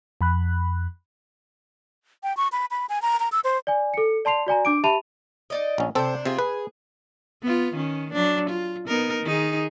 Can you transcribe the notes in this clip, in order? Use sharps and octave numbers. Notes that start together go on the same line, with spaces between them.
F2 B5 F#6
G5
C#6
B5
B5
G#5
A#5
A#5
E6
C5
D5 G#5
A4 C#7
D5 A5 C6 C7 F7
F#4 D5 G#5 A#5
D4 D6 D7
G4 E5 A5 B5 D#7 F7
D#4 D5 D#5
A#1 C#4
C3 C4 D4 A4 C5
C3 C4 F4 G#4
G#4 B4
B3 F4
D#3 C#4
F#3 D4
F4
B3 D#4 A#4
D#3 D#4 G#4